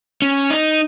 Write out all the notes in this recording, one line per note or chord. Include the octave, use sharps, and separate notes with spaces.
C#4
D#4